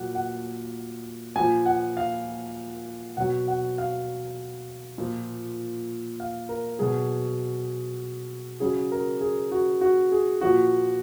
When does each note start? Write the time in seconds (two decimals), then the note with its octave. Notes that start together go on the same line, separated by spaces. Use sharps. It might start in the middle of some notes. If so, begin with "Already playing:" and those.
Already playing: A#2 F#3 F#5
0.15 F#5
1.35 A#2 G#5
1.40 F3
1.66 F#5
1.97 F5
3.17 B2 F#3 F#5
3.48 F#5
3.78 F5
4.98 A#2 F3
6.20 F5
6.49 A#4
6.79 B2 F#3 G#4
8.60 C#3 F#3 G#4
8.92 A#4
9.21 G#4
9.52 F#4
9.81 F#4
10.12 G#4
10.41 A#2 F3 F#4